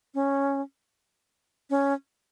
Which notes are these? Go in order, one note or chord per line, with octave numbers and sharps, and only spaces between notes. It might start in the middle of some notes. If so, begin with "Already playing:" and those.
C#4
C#4